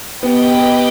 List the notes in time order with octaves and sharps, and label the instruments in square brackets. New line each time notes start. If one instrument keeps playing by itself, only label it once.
[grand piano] B3 [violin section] G4 B4 D#5 G5